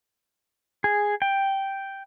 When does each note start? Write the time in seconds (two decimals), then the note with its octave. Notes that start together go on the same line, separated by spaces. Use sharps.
0.84 G#4
1.22 G5